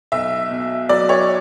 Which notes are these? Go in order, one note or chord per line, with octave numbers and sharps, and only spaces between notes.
B1 E5
B2
F#3 D5
C#5